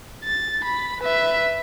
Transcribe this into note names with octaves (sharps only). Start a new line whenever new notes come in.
A6
B5
B4 E5